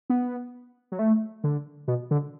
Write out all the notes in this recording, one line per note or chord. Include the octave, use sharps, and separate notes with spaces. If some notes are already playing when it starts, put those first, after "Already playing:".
B3
F#3
A3
D3
B2
D3